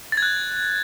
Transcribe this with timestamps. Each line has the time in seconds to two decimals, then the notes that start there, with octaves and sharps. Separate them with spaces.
0.12 A6
0.17 G#6
0.22 F#6